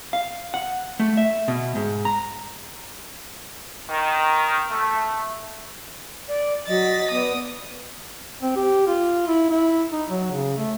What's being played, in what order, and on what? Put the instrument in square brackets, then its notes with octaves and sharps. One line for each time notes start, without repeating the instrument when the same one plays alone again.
[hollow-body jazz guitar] F5
F#5
A3
E5
B2
G#2
A#5
[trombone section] D#3
A3
[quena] D5
[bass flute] F#3 [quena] D#5 [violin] A6 B6
[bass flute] B3 [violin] D5 D#6
[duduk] C4
G4
F4
E4
E4
D#4
F#3
C#3
A3